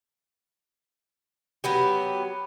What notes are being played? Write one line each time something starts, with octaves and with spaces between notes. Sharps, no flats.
F#3 B3 G4